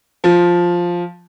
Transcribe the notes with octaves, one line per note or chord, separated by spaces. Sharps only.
F3